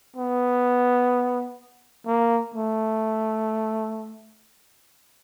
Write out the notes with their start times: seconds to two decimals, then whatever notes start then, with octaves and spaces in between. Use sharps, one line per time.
0.16 B3
2.07 A#3
2.55 A3